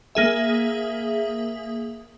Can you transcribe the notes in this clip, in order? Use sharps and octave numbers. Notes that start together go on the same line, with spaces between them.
A#3 G#4 E5